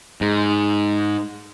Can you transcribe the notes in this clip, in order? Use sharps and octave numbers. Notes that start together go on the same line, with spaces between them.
G#2